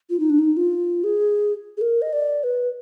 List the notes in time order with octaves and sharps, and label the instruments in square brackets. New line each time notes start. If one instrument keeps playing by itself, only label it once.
[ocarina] F4
D#4
D4
D#4
F4
G#4
G#4
A#4
D#5
D5
B4